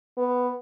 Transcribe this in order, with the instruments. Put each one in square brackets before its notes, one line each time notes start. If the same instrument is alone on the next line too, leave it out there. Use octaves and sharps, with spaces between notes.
[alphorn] B3